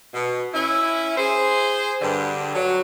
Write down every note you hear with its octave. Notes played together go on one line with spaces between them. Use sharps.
B2
C#4 E4
G#4 C5
G2 D3
F#3